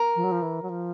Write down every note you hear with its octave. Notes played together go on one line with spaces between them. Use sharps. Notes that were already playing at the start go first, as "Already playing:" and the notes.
Already playing: A#4
F3
F#3
F3
E3
F#3
F3